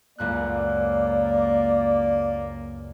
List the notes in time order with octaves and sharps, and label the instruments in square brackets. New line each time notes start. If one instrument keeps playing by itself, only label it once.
[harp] C#2 F#2 F#6 [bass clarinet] A#3 [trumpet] D5